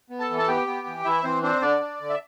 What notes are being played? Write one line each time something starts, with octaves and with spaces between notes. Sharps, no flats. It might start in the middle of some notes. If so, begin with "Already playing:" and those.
B3
A4 A5
E3
A5
B3 G4 G5
B3
E3
E3 E4 E5
E3 C4 C5
C4 D4 C5
D3 D4 D5
D4
D3
E5